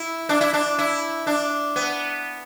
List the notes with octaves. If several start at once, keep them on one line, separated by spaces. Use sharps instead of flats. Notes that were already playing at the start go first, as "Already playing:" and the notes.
Already playing: E4
D4
E4
D4
E4
D4
B3